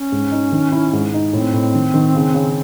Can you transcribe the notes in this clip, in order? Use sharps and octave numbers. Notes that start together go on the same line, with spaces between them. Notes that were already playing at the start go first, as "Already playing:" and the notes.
Already playing: C#4
G#2
D#4
D#3
E4
G#2
D#4
A2 C4
A2
D#3
D#3
C#3
C#3